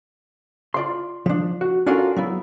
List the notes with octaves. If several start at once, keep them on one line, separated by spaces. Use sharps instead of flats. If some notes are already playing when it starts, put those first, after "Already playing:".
F4 D5 C6
F3 D4
F#4
C#4 D4 F4 F#4 A4 A#4
F#3 B3 E4